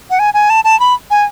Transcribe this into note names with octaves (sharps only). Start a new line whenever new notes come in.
F#5
G#5
G#5
A5
A5
B5
G#5